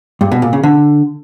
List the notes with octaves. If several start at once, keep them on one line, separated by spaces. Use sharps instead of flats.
G2
B2
A#2
C#3
D3